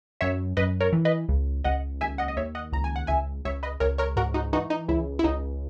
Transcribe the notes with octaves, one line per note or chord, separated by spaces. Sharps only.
F#2 C#5 E5
F#2 B4 D#5
A#4 C#5
E3
B4 D#5
C#2
C#2 D#5 F#5
D#2 E5 G#5
D#5 F#5
D#5
D#2 C#5 E5
D#5 F#5
C#2 A#5
G#5
F#5
C#2 E5 G#5
C#2 C#5 E5
B4 D#5
C#2 A#4 C#5
A#4 C#5
G#2 F#4 A#4
D#4 F#4
E3 D#4 F#4
D#4
C#2 E4
E4
C#2 D#4